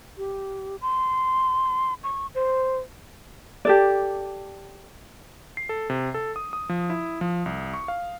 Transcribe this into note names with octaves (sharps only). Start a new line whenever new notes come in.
G4
C6
C#6
C5
G4 A4 D5
C7
A4
C3
A4
D#6
D#6
F3
E4
F3
C2
C#6
F5